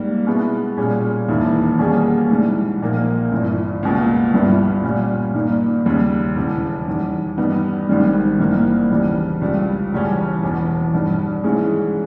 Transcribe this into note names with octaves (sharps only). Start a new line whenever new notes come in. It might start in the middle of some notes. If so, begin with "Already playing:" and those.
Already playing: G#2 G3 A#3
B2 G#3 B3 E4
A#2 G3 C#4 G#4
E1 D#2 D#3 A#3 E4
B2 G3 A#3 C#4 G#4
G#2 E3 G3
A#1 A#2 A#3 D#4 A#4
G1 G2 E3
C#2 B2 A#3
G1 G2 G3 B3 E4
A#2 G3 C#4
G2 D#3 A#3 D#4
D#2 C#3 G3
E1 E2 C#3
E2 D#3 G3
G2 G3 B3 D#4
G#1 G#2 D#3 G3
G#1 G2 E3 A#3 D#4
E1 E2 C#3 G3
C#2 C#3 G3
E1 E2 C#3 G3 C#4
E1 E2 B2
G2 D#3 G3
G#2 E3 G#3 C#4 G#4